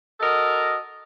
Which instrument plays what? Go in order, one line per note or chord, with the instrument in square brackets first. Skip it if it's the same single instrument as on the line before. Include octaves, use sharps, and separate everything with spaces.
[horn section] F#4 A4 A#4 D#5